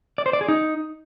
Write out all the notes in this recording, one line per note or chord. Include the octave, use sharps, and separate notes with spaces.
D5
C5
D5
G#4
D#4